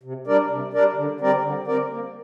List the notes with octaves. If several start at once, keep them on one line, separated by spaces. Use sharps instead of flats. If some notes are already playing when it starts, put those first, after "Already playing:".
C3
G3 D4 A#4 D5
C3
G3 D4 A#4 D5
D3
G3 C4 A#4 D5
D3
G3 C4 A#4 D5
A#3